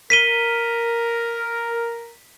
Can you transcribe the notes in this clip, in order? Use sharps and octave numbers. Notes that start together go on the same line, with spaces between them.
A#4 B6 D#7 G7